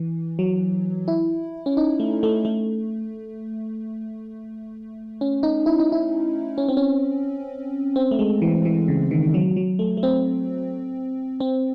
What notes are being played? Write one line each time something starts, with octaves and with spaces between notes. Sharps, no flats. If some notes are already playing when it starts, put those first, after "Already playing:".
Already playing: E3
F#3
E4
C#4
D#4
A3
A3
A3
C#4
D#4
E4
D#4
E4
C#4
C4
C#4
C4
A3
G#3
E3
E3
C#3
D#3
F#3
F#3
A3
A3
C4
C4